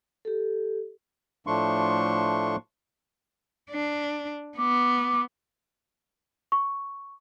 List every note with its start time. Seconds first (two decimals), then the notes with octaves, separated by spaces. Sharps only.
0.25 G4 A4
1.47 A2 F3 A3 D4 C6 C#6
3.71 D4
4.57 B3 D6
6.52 C#6